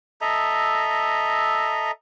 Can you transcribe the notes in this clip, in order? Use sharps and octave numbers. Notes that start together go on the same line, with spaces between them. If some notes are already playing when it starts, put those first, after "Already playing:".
A4 D#5 E5 A#5